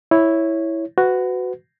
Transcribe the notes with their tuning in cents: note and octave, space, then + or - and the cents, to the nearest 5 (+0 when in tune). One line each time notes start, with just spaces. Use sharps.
E4 -5 C#5 +0
F#4 +0 B4 +30